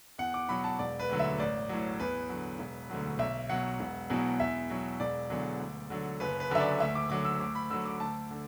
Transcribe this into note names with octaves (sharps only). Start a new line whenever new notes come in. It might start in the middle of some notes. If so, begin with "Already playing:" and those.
E2 F#5
D6
B2 F#3 B5
A5
E1 D5
B4
D2 D3 F#3
E5
A1 D5
A2 F#3
E2 B4
D3 F#3
E1
D2 D3 F#3
B1 E5
B2 F#3 F#5
E1
E2 B2 F#3
E2 E5
B2 F#3
E1 D5
E2 D3 F#3
D2
D3 F#3
F#1 B4
B4
F#2 D3 F#3 E5
D5
D2 E5
D6
D3 F#3 D6
E6
D2 D6
B5
D3 F#3 E6
D6
D2 A5
D3